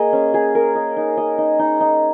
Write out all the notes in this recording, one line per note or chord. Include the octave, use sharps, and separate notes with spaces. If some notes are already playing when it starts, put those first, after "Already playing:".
Already playing: A#3 G#4 D#5
C#4
G#4
A#4
D#5
D#4
D#5
D#4
D#4
D#4